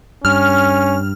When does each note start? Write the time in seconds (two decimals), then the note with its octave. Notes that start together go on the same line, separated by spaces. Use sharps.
0.25 G2 C#4 F6